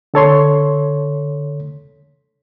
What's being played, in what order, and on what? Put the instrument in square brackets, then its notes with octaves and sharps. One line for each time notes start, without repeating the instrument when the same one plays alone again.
[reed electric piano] D3 A4 C#5 C6